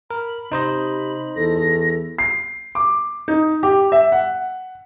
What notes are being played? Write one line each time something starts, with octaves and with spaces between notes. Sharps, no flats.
A#4 B5
C3 D#4 C5 D#5
E2 A4 A#6
C7
D6
D#4
G4
E5
F#5